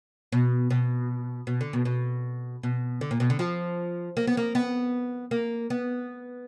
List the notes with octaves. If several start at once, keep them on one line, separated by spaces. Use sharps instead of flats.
B2
B2
B2
D3
B2
B2
B2
D3
A#2
B2
D3
F3
A#3
B3
A#3
B3
A#3
B3